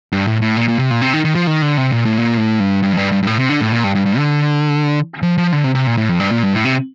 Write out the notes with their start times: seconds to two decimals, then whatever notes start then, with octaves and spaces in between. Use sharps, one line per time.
0.12 G2
0.27 A2
0.41 A2
0.56 A#2
0.68 A#2
0.79 C3
0.91 A#2
1.02 C3
1.13 D#3
1.25 D#3
1.35 F3
1.47 D#3
1.62 D3
1.77 C3
1.92 A#2
2.05 A2
2.18 A#2
2.37 A2
2.60 G2
2.83 G2
2.93 F2
2.97 G2
3.12 G2
3.23 G2
3.27 A2
3.39 C3
3.49 D3
3.61 A2
3.72 A#2
3.84 G2
3.95 G2
4.06 G2
4.17 D3
5.22 F3
5.38 F3
5.53 D3
5.64 C3
5.75 C3
5.87 A#2
5.97 A2
6.09 F2
6.20 G2
6.31 A#2
6.43 G2
6.54 A2
6.65 C3